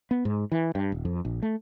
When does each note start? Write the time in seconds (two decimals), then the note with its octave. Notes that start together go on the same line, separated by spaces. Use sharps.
0.11 B3
0.25 G#2
0.52 E3
0.75 G2
0.92 D#1
1.05 F2
1.25 A#1
1.42 A3